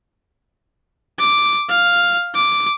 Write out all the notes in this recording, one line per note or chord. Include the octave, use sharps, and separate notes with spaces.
D6
F5
D6